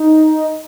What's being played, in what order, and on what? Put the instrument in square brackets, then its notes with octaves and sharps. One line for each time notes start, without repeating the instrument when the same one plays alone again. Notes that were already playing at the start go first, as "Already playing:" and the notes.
Already playing: [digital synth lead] D#4